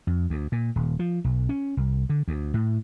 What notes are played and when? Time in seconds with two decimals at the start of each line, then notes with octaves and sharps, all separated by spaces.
0.07 F2
0.30 D2
0.52 A#2
0.76 D#1
0.99 F3
1.24 B1
1.49 C#4
1.77 C2
2.10 D3
2.28 D2
2.54 A2